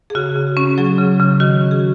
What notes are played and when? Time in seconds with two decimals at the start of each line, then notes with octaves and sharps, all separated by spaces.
0.10 G#4
0.15 C#3 F#4
0.36 C#3
0.57 C#4
0.78 F#3 G#4
0.98 C#3
1.20 C#3
1.40 D#3 F#4
1.61 C#4
1.71 G#4